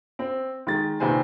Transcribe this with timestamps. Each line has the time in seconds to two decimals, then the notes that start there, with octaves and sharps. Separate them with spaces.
0.19 C4
0.67 D#3 G#3 A6
1.00 A#1 C3 D#3 B4 C5 G#5